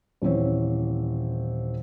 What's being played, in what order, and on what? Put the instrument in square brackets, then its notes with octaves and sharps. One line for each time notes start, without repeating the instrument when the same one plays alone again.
[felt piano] D#1 E3 C4 C#5